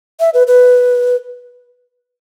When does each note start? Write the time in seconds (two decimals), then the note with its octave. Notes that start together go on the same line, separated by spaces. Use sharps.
0.20 E5
0.34 B4
0.47 B4